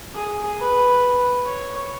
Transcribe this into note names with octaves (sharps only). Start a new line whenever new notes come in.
G#4
B4
C#5